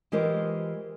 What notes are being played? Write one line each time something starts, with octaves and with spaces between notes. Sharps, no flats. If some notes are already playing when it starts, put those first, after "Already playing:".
E3 G#3 F4 G4 A#4 C5